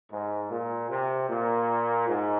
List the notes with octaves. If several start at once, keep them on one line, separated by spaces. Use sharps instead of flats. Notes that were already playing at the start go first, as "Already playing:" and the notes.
G#2
A#2
C3
A#2
G#2